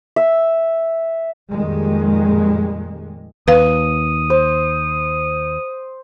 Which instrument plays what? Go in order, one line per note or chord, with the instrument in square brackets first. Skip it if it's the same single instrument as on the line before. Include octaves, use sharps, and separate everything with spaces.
[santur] E5
[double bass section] F2 A#2 D#3 G3 G#3
[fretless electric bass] D#2 [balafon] B4 F5 [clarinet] D#6
[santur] C5